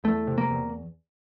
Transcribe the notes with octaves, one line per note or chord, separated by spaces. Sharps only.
E2 A3
C3
A#3
E2